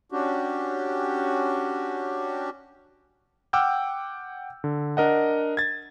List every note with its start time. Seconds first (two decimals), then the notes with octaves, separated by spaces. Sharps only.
0.12 C#4 D4 F#4 G4
3.53 F#5 G5 D6 E6 F6 G6
4.64 D3
4.97 D4 A#4 D#5 F#5
5.57 G#6 A6